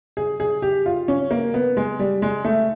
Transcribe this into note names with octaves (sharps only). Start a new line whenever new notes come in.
G#4
G#4
G4
F4
C#4
A#3
B3
G#3
G3
G#3
A3